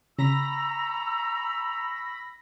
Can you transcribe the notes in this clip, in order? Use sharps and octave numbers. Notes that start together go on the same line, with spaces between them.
C#3 G#5 A#5 B5 C#6 E6 A#6